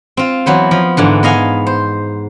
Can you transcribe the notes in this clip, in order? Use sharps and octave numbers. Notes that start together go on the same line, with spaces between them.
C4 F4
E3 F#3 B3 C5
F3
G#2 D3 E3
B3 D#5 F5 G#5
C5